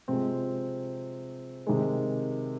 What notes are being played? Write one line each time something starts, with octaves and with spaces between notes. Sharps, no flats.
C3 F3 G#3 C4
C3 D#3 G#3